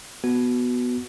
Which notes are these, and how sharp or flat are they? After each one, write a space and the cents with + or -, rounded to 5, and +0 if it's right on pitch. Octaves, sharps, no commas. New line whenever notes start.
B3 +0 F#4 +0